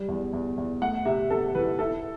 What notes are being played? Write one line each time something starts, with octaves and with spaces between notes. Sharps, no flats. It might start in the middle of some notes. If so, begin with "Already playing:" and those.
Already playing: G3
E2
E2
E2
A3 F#5
C3 E5
C3 A4
E3 B4
E4 A4